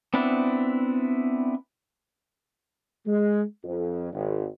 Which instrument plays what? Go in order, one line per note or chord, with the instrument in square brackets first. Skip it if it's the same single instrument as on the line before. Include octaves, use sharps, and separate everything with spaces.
[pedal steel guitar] B3 C4 D4 E4
[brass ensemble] G#3
F2
G#1